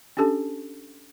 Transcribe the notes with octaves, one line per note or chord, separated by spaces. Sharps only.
C#4 D4 G4 A4 A5